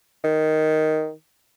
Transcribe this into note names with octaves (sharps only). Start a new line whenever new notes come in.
D#3